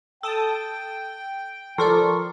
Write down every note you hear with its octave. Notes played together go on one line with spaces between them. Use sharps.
A4 G5 A5 D#6
F3 A4 A#4 D5 C6 C#6